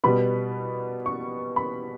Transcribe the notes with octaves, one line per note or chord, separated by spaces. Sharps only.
B2 G3 B3 B5
C#6
B5